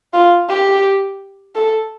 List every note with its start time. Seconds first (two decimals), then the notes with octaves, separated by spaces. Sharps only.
0.13 F4
0.49 G4
1.55 A4